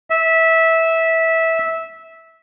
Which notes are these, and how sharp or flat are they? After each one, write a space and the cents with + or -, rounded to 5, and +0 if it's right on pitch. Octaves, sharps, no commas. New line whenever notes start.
E5 -15